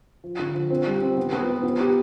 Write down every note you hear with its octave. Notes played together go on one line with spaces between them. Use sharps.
F3
D3
F3
C4
G3
C4
B3
B3
B4
B3
G4